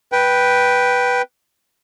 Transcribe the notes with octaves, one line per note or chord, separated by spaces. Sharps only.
B4 G5